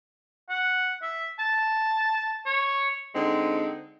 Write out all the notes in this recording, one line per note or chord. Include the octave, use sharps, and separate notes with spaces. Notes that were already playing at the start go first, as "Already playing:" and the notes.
F#5
E5
A5
C#5
D3 G#3 C4 D#4